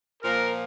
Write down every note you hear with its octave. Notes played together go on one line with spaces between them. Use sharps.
A#2 F3 A#3 A#4